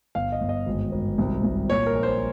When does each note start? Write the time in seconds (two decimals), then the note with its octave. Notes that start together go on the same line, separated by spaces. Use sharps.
0.15 G1 F5
0.32 D#5
0.41 G1
0.49 D#5
0.66 G#1
0.92 G#1
1.18 C2
1.44 C2
1.69 A#2 C#5
1.86 A#4
1.95 A#1
2.03 C5